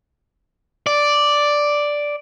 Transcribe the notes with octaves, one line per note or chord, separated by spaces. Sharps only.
D5